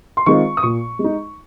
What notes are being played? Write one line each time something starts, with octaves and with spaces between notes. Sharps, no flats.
C6
D#3 G#3 C4 F4 C#6
D#6
A#2 C#6
G#3
D#4